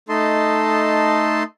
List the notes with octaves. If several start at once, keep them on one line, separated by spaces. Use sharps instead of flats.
A3 D#4 A4 D#5 A5 C6